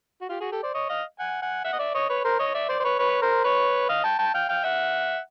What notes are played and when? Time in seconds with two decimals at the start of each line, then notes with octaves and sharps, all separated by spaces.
0.21 F#4
0.29 F4 G4
0.40 F#4 G#4
0.52 G4 A4
0.63 C5 D5
0.74 C#5 D#5
0.89 D#5 F5
1.19 F#5 G#5
1.42 F#5 G#5
1.64 E5 F#5
1.73 D#5
1.79 D5 E5
1.94 C#5 D#5
2.09 B4 C#5
2.24 A#4 C5
2.39 C#5 D#5
2.54 D5 E5
2.69 C5 D5
2.80 C5
2.84 B4 C#5
2.99 B4 C#5
3.22 A#4 C5
3.44 B4 C#5
3.89 D#5 F5
4.04 G5 A5
4.19 G5 A5
4.34 F5 G5
4.49 F5 G5
4.64 E5 F#5